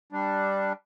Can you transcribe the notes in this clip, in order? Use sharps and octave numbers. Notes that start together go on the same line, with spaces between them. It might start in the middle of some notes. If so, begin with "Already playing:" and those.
G3 D4